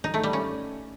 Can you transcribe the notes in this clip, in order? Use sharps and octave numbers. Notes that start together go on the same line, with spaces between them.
D#4
A3
G3
C#4